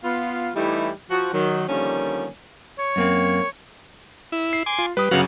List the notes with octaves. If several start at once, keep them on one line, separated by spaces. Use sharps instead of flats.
B3 F4 F5
E3 G3 A3 D#4 E4 G4
F3 F#4
D#3 F#3
D3 D#3 F3 G3 A#3 C#4
C#5
F#2 A#3 C4
E4
C7
G#5 C6 D6
F4
G3 B4 D#6
G1 C#3 F#3 F#4 F5 F#5